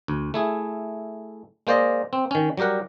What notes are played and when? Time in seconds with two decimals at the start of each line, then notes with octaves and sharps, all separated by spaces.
0.08 D2
0.34 A3 E4 G#4
1.67 G#3 A#3 C5 D5 D#5
2.13 C4
2.31 D#3 C#4
2.57 F#3 G3 G4 A#4 F#5